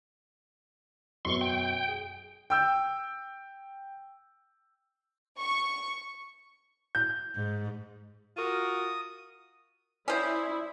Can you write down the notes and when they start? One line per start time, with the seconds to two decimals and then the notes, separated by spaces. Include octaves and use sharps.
1.25 F#2 B2 B3 C6 C#6
1.41 G5
1.88 G#4
2.50 G5 E6 G6
5.38 C#6
6.95 G6
7.36 G#2
8.37 F4 F#4 A#4 D#6
10.08 C#4 E4 C5 D5 D#6